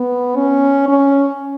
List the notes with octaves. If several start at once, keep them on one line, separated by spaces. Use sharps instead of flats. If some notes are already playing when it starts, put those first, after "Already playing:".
Already playing: B3
C#4
C#4